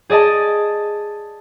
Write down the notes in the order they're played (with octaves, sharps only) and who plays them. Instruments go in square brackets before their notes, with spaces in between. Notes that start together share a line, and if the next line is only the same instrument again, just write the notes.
[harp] G#4 D5 D#5 A5